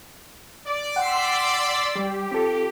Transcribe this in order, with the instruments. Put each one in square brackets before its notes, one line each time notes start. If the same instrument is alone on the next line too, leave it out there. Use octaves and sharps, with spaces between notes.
[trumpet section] D5
[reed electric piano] F#5 G5 [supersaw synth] C6 E6 B6
[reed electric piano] G3 [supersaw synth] G4
[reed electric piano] C4 F4 A4